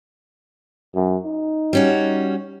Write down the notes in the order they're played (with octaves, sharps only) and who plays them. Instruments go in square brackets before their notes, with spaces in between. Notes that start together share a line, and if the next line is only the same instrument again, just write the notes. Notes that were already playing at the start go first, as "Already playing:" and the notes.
[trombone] F#2
D#4
[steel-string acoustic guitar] G3 C#4 F#4